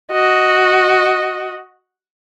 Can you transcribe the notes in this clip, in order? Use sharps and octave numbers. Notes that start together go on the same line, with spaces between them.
F#4 D#5